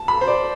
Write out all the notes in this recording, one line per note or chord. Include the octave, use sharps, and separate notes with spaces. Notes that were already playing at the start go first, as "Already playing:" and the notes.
Already playing: A5
B5
C5
D5